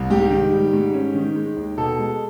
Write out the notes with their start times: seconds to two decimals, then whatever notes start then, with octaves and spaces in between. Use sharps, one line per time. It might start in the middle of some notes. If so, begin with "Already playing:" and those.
Already playing: C2
0.10 G#2 G4
0.31 D#3
0.52 G3
0.73 G#2
0.94 C#4
1.15 D#3
1.36 G#3
1.56 D#2
1.77 B2 A4
1.99 G#3